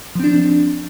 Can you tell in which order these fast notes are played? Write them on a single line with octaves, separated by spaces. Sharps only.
F3 C4 D4